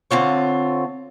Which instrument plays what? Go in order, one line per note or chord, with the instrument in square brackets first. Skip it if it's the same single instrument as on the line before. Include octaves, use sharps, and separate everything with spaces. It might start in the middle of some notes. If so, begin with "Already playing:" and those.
[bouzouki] D3 C4 F4 C#5